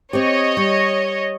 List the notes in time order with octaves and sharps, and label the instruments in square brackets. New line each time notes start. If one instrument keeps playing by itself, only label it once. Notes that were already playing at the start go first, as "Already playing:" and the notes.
[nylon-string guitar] C4 G4 [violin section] C#5 D#5
[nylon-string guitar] G3